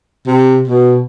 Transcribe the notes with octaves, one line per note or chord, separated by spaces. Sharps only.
C3
B2